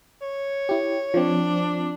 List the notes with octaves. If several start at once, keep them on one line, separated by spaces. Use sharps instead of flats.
C#5
E4 G4
F3 C4 D4